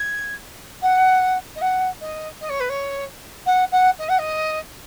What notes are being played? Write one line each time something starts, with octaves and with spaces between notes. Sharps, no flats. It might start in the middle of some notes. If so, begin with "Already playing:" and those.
Already playing: G#6
F#5
D#5
F#5
D#5
D#5
C#5
B4
C#5
F#5
F#5
D#5
F#5
D#5